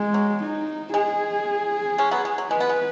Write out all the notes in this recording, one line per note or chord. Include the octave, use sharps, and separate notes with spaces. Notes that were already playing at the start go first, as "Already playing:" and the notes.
Already playing: G#3
F#3
D#4
G#3 G#4
G#3 C#4
F#3 B3
G#3
F#3
G#3 B4
B3
G#3